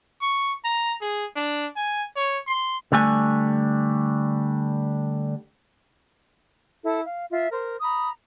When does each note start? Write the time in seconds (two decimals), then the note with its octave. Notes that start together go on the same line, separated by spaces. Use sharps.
0.21 C#6
0.64 A#5
1.01 G#4
1.35 D4
1.76 G#5
2.16 C#5
2.47 C6
2.92 D3 G3 A3 G#5
6.83 E4 A4
7.04 F5
7.30 F4 E5
7.51 A#4 C5
7.81 A#5 B5 D#6